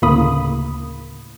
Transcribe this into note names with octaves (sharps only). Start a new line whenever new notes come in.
D2 A2 C#3 A#3 B5 D#6